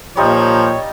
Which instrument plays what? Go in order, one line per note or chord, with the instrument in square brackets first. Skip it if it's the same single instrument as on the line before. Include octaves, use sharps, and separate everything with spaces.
[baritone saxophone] A#2 [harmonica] F3 [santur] G3 D#4 F4 [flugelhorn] C#5